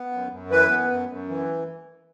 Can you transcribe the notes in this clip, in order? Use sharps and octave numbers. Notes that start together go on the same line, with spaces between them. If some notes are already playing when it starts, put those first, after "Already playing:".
Already playing: B3
F#2
F#2
E3 B4
B3
F#2
F#2
E3